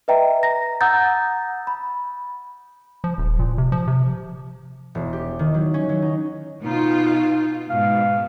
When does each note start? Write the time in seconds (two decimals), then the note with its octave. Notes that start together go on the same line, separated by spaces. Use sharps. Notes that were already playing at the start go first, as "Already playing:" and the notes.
0.08 B4 D#5 E5 G5 A#5
0.43 A#5 A#6
0.81 F#5 A#5 D#6 E6 G6 A6
1.67 B5
3.04 F3
3.18 D#1
3.39 A#2
3.58 C3
3.72 F3
3.87 C3
4.95 E1
5.13 G4
5.39 D#3
5.54 F#3
5.74 C#4
5.89 F#3
6.02 D#4
6.64 B2 D#4 F4
7.70 G#2 B2 F5